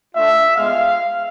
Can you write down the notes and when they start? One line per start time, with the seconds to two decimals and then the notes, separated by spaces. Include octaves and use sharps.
0.15 A3 D4 F4 E5
0.57 G#3 B3 F4 F5